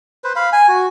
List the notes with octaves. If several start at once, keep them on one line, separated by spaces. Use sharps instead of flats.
B4 C5
F5 B5
G#5
F#4